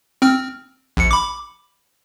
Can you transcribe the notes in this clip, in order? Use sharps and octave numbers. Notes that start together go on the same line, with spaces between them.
C4 F6
A#1 C#7
B5 D6